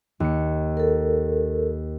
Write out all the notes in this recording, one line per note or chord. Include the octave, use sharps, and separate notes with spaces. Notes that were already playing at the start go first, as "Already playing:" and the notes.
D#2 C#7
A4 A#4